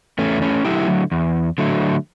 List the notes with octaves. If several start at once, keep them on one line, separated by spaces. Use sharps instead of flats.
E2 A3 C#4
A3 C#4
D3 F#3 A3 E4 G4
E2
D3 F#3 A3